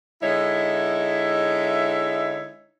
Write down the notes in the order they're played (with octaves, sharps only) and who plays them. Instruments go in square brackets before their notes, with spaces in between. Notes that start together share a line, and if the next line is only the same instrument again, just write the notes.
[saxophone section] D3 G#3 D#4 E4 C#5 E5